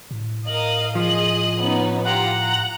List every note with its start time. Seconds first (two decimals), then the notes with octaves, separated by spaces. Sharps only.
0.11 A2
0.47 A#4 D#5 F5 F#7
0.95 F3 G#4 D#5
1.61 B3 C#4 D#4
2.04 F4 G4 F#5 A#5
2.40 A#5